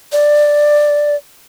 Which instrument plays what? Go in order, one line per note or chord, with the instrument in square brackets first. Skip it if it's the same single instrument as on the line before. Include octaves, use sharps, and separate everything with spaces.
[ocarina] D5